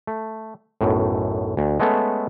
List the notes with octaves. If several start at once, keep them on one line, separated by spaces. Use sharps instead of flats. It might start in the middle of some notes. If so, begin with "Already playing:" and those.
A3
B1 F#2 A2
D2
G#3 A3 B3 C#4 A4